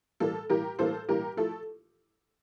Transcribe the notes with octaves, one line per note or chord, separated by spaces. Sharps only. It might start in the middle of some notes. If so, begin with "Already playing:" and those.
A2 E3 G3 A#3 A4
A2 E3 G3 A#3 G4 A#4
A2 E3 G3 A#3 A4 C5
A2 E3 G3 A#3 G4 A#4
F3 A3 E4 A4